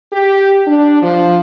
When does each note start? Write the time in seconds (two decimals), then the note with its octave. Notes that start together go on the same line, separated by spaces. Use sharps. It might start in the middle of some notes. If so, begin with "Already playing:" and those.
0.12 G4
0.66 D4
1.01 F3